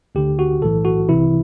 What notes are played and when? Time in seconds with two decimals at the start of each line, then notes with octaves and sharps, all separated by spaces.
0.15 D2 D3 G4
0.39 F#4
0.62 B1 A2 E3 A4
0.85 F#4
1.08 C2 C3 E3 E4